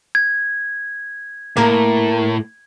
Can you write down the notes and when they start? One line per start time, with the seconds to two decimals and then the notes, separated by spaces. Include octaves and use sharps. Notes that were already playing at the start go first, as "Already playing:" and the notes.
0.15 G#6
1.57 A2 A#3 A#4